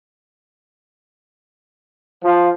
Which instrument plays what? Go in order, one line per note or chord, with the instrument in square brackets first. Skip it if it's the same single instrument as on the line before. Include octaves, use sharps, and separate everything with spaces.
[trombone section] F3